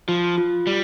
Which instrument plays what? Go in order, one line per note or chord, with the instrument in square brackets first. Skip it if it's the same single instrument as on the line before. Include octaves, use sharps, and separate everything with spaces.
[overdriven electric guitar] F3 [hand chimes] F4
[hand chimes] F4
[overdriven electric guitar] G3 [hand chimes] F4